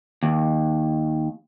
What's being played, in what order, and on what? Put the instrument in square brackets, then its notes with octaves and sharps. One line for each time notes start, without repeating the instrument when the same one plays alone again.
[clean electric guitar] D#2